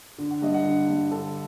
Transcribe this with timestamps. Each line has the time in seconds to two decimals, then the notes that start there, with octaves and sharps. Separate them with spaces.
0.18 D3
0.31 F#5
0.42 G2 D#5
0.54 F#5
0.65 D3
0.88 G2
1.11 D3 A4